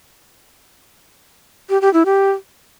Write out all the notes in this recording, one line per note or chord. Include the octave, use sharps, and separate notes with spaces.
G4
G4
E4
G4